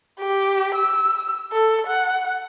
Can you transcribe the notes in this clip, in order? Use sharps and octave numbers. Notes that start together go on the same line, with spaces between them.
G4
E6
A4
F#5